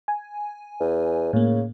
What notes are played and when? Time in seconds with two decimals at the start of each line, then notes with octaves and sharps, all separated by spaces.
0.08 G#5
0.80 E2
1.33 A2 C#3 A#3